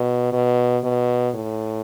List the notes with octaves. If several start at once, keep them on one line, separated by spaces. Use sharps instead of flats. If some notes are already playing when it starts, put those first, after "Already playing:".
Already playing: B2
B2
B2
A2